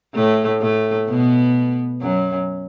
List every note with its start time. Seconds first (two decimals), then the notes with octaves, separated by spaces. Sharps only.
0.15 A2 A3
0.61 A2 A3
1.08 B2 B3
2.02 F#2 F#3